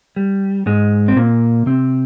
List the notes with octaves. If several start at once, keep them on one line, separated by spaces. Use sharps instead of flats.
G3
G#2 G#3
C4
A#2 A#3
C3 C4